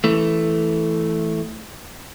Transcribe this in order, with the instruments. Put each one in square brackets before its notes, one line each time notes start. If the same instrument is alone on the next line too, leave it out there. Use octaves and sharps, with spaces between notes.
[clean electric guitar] E3 A3